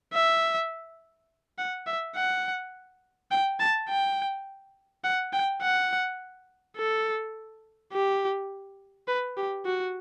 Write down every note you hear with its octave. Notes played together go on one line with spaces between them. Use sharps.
E5
F#5
E5
F#5
G5
A5
G5
F#5
G5
F#5
A4
G4
B4
G4
F#4